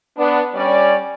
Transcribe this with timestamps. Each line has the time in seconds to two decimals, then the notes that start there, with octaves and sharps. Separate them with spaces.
0.17 B3 D4
0.55 G3 C#4 D5